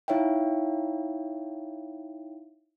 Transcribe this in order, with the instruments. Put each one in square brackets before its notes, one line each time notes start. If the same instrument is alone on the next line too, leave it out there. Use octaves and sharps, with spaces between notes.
[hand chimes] D#4 E4 C#5 E5 F5 G5